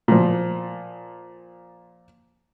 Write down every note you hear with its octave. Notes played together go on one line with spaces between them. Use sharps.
A#2 F3